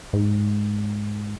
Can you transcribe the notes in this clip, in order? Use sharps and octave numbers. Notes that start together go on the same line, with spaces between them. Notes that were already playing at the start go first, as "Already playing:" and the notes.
G#2